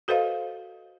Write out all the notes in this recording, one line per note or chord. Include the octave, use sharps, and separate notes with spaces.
F#4 A4 B4 C5 D#5 F5